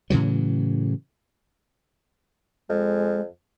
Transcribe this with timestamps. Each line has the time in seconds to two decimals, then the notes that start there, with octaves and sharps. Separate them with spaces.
0.10 A2 C#3 E3 F#3
2.69 F2 G#3